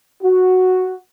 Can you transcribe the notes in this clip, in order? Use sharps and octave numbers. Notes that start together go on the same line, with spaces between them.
F#4